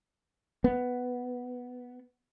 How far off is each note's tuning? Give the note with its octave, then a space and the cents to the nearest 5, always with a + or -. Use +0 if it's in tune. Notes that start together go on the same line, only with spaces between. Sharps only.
B3 +5